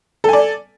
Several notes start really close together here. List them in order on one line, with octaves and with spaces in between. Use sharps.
A4 G#5 D5